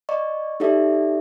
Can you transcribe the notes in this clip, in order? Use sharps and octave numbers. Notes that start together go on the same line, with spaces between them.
D5 D#5 C#6
D#4 G4 A4 D5 E5